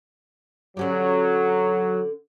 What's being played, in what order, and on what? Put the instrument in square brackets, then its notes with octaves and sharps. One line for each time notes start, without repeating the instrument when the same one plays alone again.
[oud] D3 C#4 G4 [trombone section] F#3